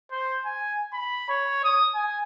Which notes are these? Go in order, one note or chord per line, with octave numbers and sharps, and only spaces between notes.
C5
G#5
B5
C#5
D#6
G#5